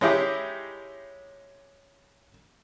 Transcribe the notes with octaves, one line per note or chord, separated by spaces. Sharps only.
G#3 C#4 D#4 E4 G4 G#4